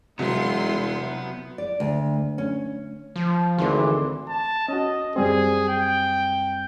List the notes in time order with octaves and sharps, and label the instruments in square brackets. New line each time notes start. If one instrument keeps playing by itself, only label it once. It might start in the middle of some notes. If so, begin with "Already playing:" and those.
[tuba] E1 [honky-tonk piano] C2 F#3 [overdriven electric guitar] B3 [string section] E4 F4 C6
[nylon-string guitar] D5
D2
C#4
[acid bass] F3
[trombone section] G#1 D2 [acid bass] E3 [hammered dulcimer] C6 D6
[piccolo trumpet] A5
[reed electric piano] C#4 F#4 [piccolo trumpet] D#5
[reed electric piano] F#2 G3 C4 [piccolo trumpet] G#4
[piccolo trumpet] G5